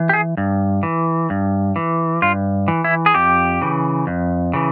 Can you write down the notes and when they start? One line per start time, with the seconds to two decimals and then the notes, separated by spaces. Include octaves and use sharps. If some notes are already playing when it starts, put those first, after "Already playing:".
Already playing: E3
0.09 G4
0.13 G#4
0.37 G2
0.83 E3
1.30 G2
1.76 E3
2.22 G2 F4
2.68 E3
2.84 E4
3.06 G#4
3.14 F2 G4
3.61 C#3 E3
4.07 F2
4.53 C#3 E3